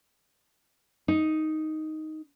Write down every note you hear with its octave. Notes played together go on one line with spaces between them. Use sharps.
D#4